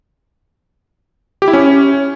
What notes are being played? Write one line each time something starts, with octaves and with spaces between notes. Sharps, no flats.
G4
E4
C#4